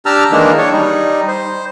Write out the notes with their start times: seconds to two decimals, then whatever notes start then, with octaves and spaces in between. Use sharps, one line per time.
0.06 D4 G4 A5 A#5 E6 F6
0.32 D#3 E3 G#3 A#3 D4 D#4
0.58 D4 C#5
0.72 G3 D#4
1.28 C5